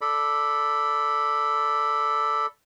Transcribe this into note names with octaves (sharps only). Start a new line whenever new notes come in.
A4 D5 B5